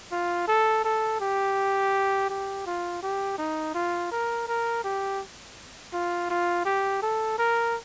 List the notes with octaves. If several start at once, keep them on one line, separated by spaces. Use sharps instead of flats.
F4
A4
A4
G4
G4
F4
G4
D#4
F4
A#4
A#4
G4
F4
F4
G4
A4
A#4